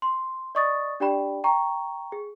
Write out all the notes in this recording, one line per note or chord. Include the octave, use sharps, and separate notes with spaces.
C6
D5 D#5 C#6 D#6 A6
D4 G4 D5 G5 B5
G5 A#5 C#6
G#4